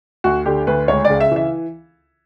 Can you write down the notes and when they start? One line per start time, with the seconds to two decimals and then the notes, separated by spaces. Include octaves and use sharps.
0.24 D2 F#4
0.46 D3 G4
0.67 D2 B4
0.88 C#2 C#5
1.05 D5
1.10 C#3
1.20 E5
1.31 E3 E5